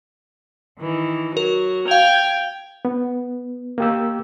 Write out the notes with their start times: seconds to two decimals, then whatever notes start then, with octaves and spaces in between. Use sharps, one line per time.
0.79 D#3 E3
1.37 F#3 A#4
1.88 F5 G5 G#6 F7
2.85 B3
3.78 A#3 G4 E6